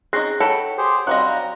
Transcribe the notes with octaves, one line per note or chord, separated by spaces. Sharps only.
C4 C#4 D#4 G#4 F#6 A#6 C7
A4 C#5 F#5 G5 B5
G4 G#4 C5
F#3 G3 C4 D#5 F5 F#6
F5 A#5